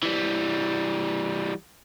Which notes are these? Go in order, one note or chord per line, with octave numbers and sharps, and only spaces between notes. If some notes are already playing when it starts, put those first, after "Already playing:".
E3 G3